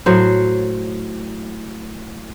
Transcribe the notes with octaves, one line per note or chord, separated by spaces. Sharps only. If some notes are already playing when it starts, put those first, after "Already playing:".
A2 F#3 C5